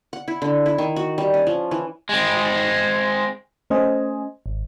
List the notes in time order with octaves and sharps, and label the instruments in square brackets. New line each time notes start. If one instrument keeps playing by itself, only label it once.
[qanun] F#5
E4
D3
E4
D#3
F#4
G3
C#4
F3
E3
[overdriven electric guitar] G#3 C4
[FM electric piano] A3 C#4 C5 D#5 G#5
G#1